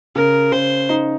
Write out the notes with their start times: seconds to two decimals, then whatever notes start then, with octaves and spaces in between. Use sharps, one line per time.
0.16 C#3 A#4
0.52 C#3 C5
0.89 D#4